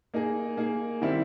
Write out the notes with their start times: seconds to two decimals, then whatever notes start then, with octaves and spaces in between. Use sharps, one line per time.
0.14 A#3 D#4 G#4
0.57 A#3 D#4 G#4
1.01 D#3 G3 C4 E4